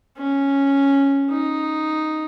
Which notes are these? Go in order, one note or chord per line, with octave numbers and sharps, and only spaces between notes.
C#4
D#4